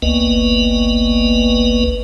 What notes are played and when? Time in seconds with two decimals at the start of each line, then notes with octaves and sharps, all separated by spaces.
0.02 G1 C#2 A#3 B3 B4 D#5